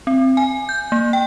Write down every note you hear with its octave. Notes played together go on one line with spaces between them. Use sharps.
C4
G#5
G6
A#3
G5